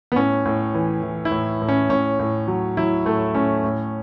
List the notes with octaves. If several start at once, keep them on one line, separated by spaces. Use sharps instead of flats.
B3
A2 C#4
A2
E3
E3
E4
A2
A2
C#4
A2 C#4
A2
F#3
F#3 E4
A2 A3
A2 C#4
A2